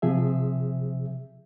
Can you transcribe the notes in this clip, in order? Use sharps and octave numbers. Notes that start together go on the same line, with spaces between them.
C3 F3 G#4 E5